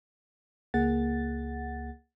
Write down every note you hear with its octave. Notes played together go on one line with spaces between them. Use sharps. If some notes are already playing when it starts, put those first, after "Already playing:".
C#2 A#3 G#4 F#5 A6